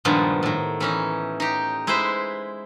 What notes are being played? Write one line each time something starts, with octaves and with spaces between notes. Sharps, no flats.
G2 A#2 D#3 F3 G#3 B3
A2 D#3
E3 C#4 D#4
D#4 G4
G#3 E4 G#4 B4 C5